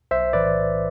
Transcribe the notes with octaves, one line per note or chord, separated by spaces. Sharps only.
B1 C5 E5
A2 E3 B4 D5